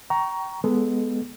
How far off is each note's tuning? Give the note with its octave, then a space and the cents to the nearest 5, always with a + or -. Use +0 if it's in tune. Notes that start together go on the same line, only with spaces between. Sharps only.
G5 -30 A#5 +10 C#6 +15
G#3 +0 B3 +0 A4 -20